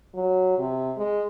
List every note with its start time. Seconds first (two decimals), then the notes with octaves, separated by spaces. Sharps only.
0.14 F#3
0.58 C3
0.97 G#3